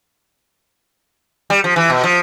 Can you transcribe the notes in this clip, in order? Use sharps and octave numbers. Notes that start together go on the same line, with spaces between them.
G3
F3
E3
B2
F3